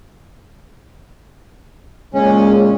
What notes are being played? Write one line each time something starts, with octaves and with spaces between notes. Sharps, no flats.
A#2 C#3 G#3 C#4